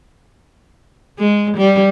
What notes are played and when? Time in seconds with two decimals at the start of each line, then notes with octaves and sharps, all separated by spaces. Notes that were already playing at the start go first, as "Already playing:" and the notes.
1.19 G#3
1.57 G3